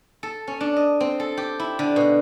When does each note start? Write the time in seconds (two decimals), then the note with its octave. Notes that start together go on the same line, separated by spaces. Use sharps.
0.23 A4
0.48 C#4
0.61 D4
0.77 D#5
1.00 C4
1.20 A4
1.37 G4
1.60 E4
1.79 D3
1.96 B2